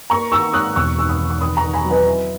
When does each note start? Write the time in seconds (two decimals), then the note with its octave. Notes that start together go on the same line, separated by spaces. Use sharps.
0.10 A#3 A#5 C#6
0.32 D#3 C#6 E6
0.53 G#2 D#6 F#6
0.76 E1 C#6 E6
0.98 D#3 E6
1.09 B5 D#6
1.19 E1
1.30 C#6
1.41 D#3 B5 D#6
1.57 A#5 C#6
1.63 D#3
1.73 G#5 B5
1.85 F#3
1.90 B4 D#5
2.06 E4